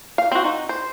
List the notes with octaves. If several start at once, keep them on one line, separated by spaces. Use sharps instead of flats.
F5
C4 F#4
D#4
C5